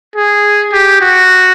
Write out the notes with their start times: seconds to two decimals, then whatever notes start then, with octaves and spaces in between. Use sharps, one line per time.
0.15 G#4
0.72 G4
1.01 F#4